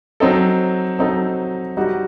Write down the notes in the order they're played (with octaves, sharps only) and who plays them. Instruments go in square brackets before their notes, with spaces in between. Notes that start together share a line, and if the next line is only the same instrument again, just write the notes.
[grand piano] F#3 C4 D#4 A4
F#3 C4 D#4 A4
G3 D#4 F#4